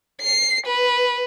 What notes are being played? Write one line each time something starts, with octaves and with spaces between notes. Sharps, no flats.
C7
B4